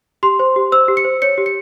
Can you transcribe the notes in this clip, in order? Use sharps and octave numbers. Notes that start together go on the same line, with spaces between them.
G4 C6
C5
G4
C5 E6
G4
C#7
C5
C#5 C#7
G4
C#7